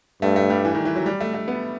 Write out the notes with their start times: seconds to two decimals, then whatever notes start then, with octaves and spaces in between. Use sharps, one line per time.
0.22 G2 A3
0.36 A3
0.50 G3
0.65 E3
0.75 D#3
0.85 E3
0.96 F#3
1.06 G3
1.21 A3
1.34 A3
1.48 B3